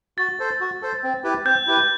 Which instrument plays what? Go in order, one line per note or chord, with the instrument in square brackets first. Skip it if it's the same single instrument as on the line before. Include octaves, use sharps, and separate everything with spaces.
[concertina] F#4 [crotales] A6
[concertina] A4 C5
F#4
A4 C5
C4
E4 G4 B4
[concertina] C4 [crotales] G6
[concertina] E4 G4 B4